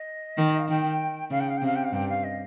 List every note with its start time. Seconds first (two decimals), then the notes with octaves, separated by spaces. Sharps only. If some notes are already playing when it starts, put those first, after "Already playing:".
Already playing: D#5
0.38 D#3
0.59 F5
0.68 D#3 G5
1.30 C#3 F5
1.40 G5
1.49 F5
1.57 G5
1.62 C3 F5
1.75 G5
1.84 F5
1.93 G2 G5
2.09 F5
2.24 D#5